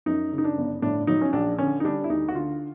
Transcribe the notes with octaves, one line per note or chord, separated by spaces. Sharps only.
F#2 D#4
C#3
D#4
D4
G1
A2 D4
F#3 D#4
C#4
A#1 D4
D3 C#4
D#4
G3 D4
E4
D2 D#4
F#4
D3 F4